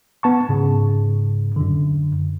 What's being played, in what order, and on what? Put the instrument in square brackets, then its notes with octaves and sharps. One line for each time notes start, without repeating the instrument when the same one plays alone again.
[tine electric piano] B3 A5 C#6
G#2 C#3
F#2 D3